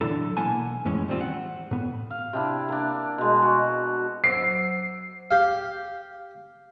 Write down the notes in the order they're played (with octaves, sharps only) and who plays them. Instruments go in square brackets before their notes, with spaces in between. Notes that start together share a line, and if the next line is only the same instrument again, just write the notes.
[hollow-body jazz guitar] A#2 D3 E3 F#3 E4 A4
B1 A#3 E4 F#5 G#5 A5
F2 A2 E3 G#3 C#4
D#3 G3 B3 C4 F4
F#5
A2 B3
[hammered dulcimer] F5
C3 D4 E4
A#3 D4
B2 G#3
F#4
[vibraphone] F#3 C5 E6 [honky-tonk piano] C7
[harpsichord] G4 F5